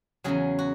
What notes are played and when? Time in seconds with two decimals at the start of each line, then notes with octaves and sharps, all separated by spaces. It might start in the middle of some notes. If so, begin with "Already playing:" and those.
0.24 E2 C#3 F#3 G#4
0.59 F#4